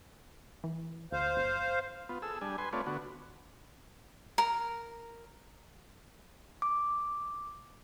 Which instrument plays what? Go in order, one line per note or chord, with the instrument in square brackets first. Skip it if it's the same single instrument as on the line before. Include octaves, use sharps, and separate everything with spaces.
[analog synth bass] E3
[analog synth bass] D2 [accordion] C5 F5
[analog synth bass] G1
[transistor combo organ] B3 F4
G#4 A4 E6
G3 D4 G#5
B4 G#5 C6
A3 C4 F4 B4 C#5 D5
D3 B3 F#4
[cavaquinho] A#4
[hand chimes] D6